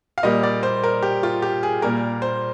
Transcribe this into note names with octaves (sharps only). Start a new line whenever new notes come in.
F5
A#2 G3 A#3 D#5
D5
C5
A#4
G4
F4
G4
G#4
A#2 G3 A#3 A#4
C5